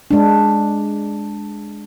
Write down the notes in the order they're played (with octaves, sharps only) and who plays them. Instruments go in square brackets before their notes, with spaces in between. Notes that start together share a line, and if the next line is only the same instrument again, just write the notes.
[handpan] G#3 D4